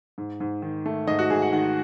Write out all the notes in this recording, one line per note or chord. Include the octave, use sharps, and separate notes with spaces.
G#2
G#2
D#3
A3
G#2 D#5
F#4
G#2 G#4
F#5
D#3 F#5